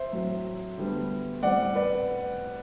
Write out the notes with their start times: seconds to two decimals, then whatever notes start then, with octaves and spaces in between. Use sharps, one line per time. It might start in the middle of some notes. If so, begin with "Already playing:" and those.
Already playing: C5 E5
0.12 A2 F#3 C4
0.77 D3 G3 B3
1.43 A2 G3 C4 D5 F#5
1.75 B4 D5